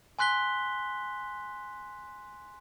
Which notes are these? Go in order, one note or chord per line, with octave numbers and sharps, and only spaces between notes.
G#5 C6 F#6 B6 G7